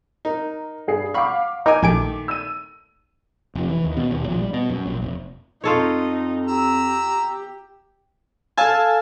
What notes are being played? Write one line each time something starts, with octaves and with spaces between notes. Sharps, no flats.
D#4 A#4
G2 G#4 C7
F5 F#5 B5 C#6 D6
D#4 A#4 G5 G#5 D6
A#1 D#3 A3 G#5 D7
E6 D#7
F1
E3
D#2
B2
D#1
A#1
G3
B2
F#2
A#1
F1
F2 D#4 F4 A4 C#5
G4 A#5 E6
A4 F5 G#5 A5 E6